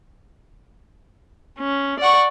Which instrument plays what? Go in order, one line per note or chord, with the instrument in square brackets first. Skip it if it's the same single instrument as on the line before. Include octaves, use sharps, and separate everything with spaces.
[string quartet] C#4
D5 F#5 C#6